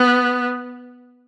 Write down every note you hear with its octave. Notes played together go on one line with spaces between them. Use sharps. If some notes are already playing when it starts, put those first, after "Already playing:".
Already playing: B3